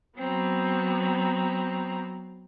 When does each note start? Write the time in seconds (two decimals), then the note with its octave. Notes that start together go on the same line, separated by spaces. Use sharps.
0.19 F#3 B3 C4 A#5